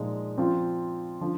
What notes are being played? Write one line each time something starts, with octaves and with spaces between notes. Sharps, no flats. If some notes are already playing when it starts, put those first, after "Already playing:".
Already playing: A#2 F3 G#3 D#4
F3 C4 F4
D3 F3